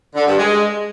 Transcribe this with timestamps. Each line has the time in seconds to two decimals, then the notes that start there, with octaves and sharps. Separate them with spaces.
0.15 D3
0.26 G2
0.38 G#3